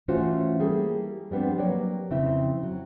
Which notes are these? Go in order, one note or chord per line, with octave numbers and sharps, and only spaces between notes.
E3 A3 C#4 F4 F#4 C5
G3 A#3 G#4 A4
F3 G3 B3 C4 D4
F#3 G3 A#3 C#5 D5
F2 C#3 C4 E4 E5
F#3